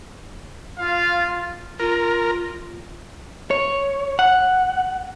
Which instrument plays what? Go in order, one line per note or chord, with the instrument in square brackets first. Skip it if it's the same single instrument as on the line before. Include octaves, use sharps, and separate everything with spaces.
[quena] F4 [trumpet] F5
[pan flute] F4 [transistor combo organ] A#4
[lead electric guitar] C#5
F#5